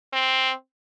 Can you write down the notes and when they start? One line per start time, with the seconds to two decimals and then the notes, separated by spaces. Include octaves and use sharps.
0.13 C4